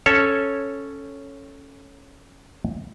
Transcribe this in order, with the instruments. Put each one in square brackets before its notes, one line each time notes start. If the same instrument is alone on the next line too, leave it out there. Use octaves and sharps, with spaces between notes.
[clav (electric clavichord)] C#4 A4 C#5